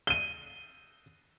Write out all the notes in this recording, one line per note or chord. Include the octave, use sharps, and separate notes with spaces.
D#7 G7